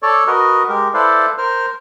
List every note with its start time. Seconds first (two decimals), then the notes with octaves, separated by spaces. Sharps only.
0.03 A4 C#5 D5 C#6
0.27 F#4 A#4 B4 D#5
0.69 G#3 G4 A#4
0.94 E4 A4 B4 C5 D5 F5
1.38 A#4 C5 F6